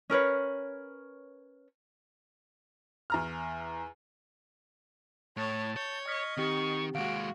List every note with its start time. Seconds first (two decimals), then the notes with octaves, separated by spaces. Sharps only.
0.10 C#4 A#4 B4 C#5
3.10 E2 A#5 F6
5.37 A2 C#5 A5
5.77 C#5 G6
6.08 D#5 C#6 F6 G#6 B6
6.37 D#3 C4 G4 C#6
6.95 D#2 G#3 F#4 F5 F#5 D7